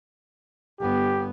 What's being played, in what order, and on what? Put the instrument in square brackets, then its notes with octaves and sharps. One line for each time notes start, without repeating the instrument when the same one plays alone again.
[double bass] G1 B3 [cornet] G4